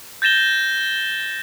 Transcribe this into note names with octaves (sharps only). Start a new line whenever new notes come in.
G6 A6 A#6 E7 G7